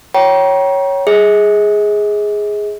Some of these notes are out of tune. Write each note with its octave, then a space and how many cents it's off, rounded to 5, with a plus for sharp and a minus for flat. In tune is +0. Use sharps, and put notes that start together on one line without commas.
C#5 +0 G5 -25 A#5 +35
G#4 +0 D#5 +40